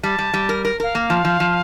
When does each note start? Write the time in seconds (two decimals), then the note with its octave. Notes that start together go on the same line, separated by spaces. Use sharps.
0.03 G3 A5
0.18 G3
0.34 G3
0.49 A#4
0.65 A#4
0.80 A#4 F5
0.95 A#3
1.10 F3
1.25 F3
1.40 F3